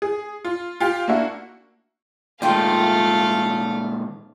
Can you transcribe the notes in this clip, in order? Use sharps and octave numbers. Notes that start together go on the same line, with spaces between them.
G#4
F4
F4 G4 F5
A#3 D4 E4 F#4
A#2 D#3 G#3 A3 F4 F5 G5